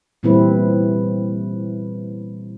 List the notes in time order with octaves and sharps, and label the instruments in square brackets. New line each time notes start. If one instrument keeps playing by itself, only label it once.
[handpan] A#2 E3 G3 C4 E4 B4